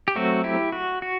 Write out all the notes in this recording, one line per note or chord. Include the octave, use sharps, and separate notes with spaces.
G4
F#3 A3 C4 F#4
E4 G4
F#4
F#4